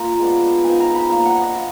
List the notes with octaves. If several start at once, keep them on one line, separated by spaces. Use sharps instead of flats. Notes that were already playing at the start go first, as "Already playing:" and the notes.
Already playing: A#3 F4 A#5
G#3 B3 D4
F3 B3 D#4 G#5
A#5
B5
A#3 D4 F4 A#5
F#5
D#5
F4